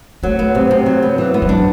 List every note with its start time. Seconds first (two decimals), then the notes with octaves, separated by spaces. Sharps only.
0.23 F#3 A3
0.39 B3
0.55 C3
0.71 C3
0.86 F#3
1.02 B3
1.18 E3
1.34 B3
1.42 F#3
1.49 D4